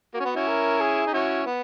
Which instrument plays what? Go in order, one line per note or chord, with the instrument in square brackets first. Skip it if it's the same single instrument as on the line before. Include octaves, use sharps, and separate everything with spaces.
[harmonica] A#3 [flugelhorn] F#4
[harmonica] C#4
B3
C#4 E4
[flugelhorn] A#4
G#4
[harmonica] D#4
[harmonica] C#4 E4 [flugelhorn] F#4
[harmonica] B3